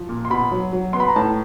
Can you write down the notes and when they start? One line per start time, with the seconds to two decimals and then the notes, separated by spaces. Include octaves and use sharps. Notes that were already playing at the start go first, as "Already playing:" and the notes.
Already playing: F3
0.09 A#2
0.25 C6
0.30 B2 B5
0.52 F#3
0.73 F#3
0.93 B3 C6
1.00 B5
1.08 A#5
1.16 A2 A5